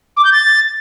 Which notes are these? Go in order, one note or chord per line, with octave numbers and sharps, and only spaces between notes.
D6
G6
A6